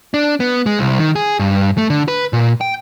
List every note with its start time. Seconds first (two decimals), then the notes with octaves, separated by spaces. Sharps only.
0.14 D4
0.40 B3
0.66 G#3
0.79 C2
0.99 D#3
1.16 G#4
1.39 G2
1.78 A3
1.90 D3
2.08 B4
2.33 A#2
2.61 G5